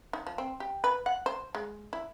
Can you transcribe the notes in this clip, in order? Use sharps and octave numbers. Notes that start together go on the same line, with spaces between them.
D#4
F3
C4
G4
B4
F#5
C5
G#3
E4